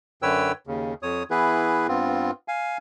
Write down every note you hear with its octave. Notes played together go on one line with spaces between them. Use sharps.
F#2 D3 B4 C#5 G5 E6
D#2 C#3
F2 C#5 D#6
E3 B3 E4 G#4 B4
G2 B3 C4 F4
F5 G#5